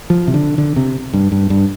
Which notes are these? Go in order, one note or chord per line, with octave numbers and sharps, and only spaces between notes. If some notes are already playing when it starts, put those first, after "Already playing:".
F3
C3
D3
D3
C3
G2
G2
G2